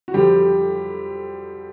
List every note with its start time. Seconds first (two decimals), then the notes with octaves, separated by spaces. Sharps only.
0.08 F#4
0.14 F2 D3 F3 G3 G4